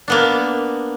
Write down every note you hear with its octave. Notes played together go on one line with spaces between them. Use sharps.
A#3 B3 D4